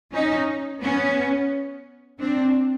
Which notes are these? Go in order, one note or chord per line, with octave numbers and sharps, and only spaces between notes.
C#4 D#4
B3 C#4
C4 D4